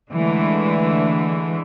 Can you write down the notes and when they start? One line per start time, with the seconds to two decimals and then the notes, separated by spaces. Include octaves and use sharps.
0.13 D3 E3 G#3 A3